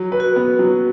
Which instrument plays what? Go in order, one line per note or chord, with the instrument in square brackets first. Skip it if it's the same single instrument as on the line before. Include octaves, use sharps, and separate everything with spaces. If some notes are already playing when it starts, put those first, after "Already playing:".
Already playing: [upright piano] F#3
B4
[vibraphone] F#4
[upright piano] B3
F#3